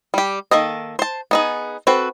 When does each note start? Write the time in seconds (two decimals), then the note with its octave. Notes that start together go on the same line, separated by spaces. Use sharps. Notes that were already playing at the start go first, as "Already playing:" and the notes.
0.14 G3 G4
0.51 D#3 A#3 A4 D#5
0.99 C5 A5
1.31 B3 D#4 G#4
1.87 C4 F#4 A4 B4